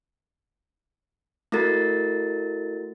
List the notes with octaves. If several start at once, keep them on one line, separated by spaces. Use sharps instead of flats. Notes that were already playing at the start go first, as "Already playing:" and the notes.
A3 E4 F#4 A#4 A6